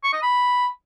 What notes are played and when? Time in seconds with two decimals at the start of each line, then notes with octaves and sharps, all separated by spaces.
0.04 C#6
0.13 D#5
0.22 B5